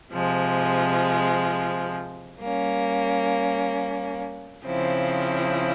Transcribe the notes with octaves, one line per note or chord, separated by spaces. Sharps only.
C3 F3 G#3
G3 A#3 C#4
C#3 F3 C4 E4